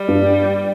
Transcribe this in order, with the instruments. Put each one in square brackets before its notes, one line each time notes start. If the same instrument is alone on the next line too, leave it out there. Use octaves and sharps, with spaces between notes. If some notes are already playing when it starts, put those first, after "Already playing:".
Already playing: [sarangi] G3
[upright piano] G2